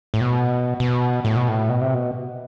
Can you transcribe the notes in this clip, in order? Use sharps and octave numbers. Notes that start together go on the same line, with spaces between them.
A2
B2
B2
A2
B2
A2
B2
C3
B2